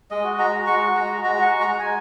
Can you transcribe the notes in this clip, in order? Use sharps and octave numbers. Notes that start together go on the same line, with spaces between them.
G#3 D#5
F#4
G#3 A#5
F#4
G#3 C#6
F#4
G#3 A#5
F#4
G#3 A#5
F#4 C#6
G#3
F#4 A#5
G#3 G#5